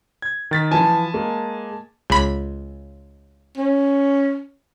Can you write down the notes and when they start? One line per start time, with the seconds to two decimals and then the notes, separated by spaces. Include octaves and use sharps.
0.22 G#6
0.51 D#3 A6 B6
0.71 E3 F3 G#5 A5
1.14 G#3 A#3
2.10 C#2 B5
3.57 C#4